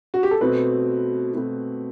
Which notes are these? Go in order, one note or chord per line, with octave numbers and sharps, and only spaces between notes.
F#4
G4
A4
B2 A3 C4 B4
B2 A3 C4